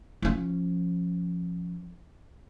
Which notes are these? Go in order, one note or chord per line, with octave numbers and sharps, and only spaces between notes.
F3 C#4